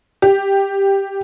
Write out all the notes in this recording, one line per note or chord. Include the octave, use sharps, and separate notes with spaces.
G4